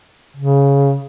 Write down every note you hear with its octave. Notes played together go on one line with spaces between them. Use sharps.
C#3